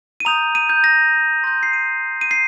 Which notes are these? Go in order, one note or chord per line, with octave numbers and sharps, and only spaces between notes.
D#7
A#5 D#6 G6 F7
D#7
G6
A#6
C6 G6 A#6
C7
D#7
D#7
C7